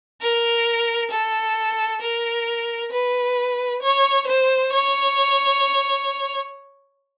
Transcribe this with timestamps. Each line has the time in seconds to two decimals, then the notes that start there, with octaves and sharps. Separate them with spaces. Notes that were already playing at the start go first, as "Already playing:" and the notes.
0.21 A#4
1.11 A4
2.01 A#4
2.92 B4
3.82 C#5
4.27 C5
4.73 C#5